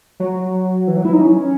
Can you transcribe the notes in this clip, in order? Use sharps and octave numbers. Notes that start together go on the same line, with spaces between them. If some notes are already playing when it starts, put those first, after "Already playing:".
F#3
E3
F#3
E4
D#4
C#4